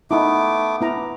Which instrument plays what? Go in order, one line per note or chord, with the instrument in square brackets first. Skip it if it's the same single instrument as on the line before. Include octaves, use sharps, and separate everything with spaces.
[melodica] A3 B3 D6 [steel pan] D#4 E4
[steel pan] B3 E4 A#5